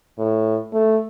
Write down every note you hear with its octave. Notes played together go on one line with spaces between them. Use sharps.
A2
A3